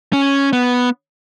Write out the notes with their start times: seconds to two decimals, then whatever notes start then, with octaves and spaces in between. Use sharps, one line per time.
0.13 C#4
0.53 B3